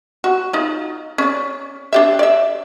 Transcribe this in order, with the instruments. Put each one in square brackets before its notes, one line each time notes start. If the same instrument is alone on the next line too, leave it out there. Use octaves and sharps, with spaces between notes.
[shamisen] F#4
D#4 F4
C#4 D5
D4 G4 E5
D5 E5